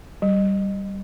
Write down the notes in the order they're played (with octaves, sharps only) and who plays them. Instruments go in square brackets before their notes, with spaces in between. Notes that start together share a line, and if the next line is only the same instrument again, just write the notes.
[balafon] G3